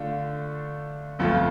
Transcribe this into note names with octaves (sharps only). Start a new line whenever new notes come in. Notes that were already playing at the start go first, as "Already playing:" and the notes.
Already playing: D3 A3 D4 F4
G1 F2 F3 A3 F4